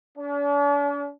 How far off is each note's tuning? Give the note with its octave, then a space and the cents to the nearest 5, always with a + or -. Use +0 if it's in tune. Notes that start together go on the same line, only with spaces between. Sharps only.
D4 -45